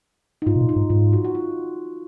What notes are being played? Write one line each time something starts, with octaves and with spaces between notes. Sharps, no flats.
D#4
G#2 F4
B2
A#2
D#4
G#2
G#2 F4
F#4
F#4
F4